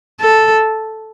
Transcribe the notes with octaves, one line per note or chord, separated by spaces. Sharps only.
A4